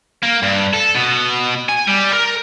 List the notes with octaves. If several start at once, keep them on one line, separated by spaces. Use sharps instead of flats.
A#3
G2
A4
B2
G#5
G3
A#4